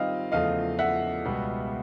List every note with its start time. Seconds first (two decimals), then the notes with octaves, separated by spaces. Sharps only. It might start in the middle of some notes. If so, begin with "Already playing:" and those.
Already playing: D#3 G3 C4 F4 D#5 F5
0.32 E2 C#3 F3 A3 D#5 F5
0.79 E5 F#5
1.25 C#2 B2 G3 B3